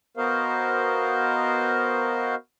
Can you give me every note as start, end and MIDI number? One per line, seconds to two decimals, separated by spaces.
0.17 2.35 59
0.17 2.35 66
0.17 2.35 70
0.17 2.35 72
0.17 2.35 75
0.17 2.35 77